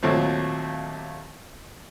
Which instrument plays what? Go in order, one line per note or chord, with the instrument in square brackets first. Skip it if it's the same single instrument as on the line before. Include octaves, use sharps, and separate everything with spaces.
[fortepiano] D#2 A#2 F#3 A3 C4